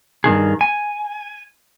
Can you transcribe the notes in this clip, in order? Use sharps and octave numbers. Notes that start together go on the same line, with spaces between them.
G2 B2 D#3 G#4
G#5